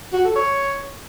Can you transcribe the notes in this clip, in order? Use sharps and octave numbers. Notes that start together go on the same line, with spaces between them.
F#4
A4
C#5